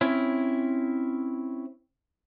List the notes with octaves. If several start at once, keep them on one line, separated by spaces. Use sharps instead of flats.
C4 C#4 E4